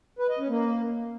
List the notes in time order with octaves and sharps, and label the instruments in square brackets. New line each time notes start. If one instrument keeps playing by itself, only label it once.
[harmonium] B4
D#5
C#4
A#3